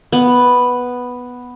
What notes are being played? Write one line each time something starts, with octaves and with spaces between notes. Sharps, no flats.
B3